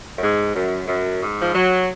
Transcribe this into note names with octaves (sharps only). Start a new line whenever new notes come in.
F#2
G#2
F#2
F#2
G#2
F3
F#3